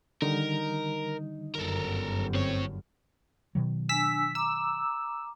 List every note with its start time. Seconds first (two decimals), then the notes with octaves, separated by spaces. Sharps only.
0.22 D3 D#3 G3 D#4 A#4
1.55 G1 F#2 A4 A#4
2.34 A2 C4 C#5
3.55 B2 D#3 F#3
3.89 D4 G#5 E6 B6
4.35 A#5 D6 E6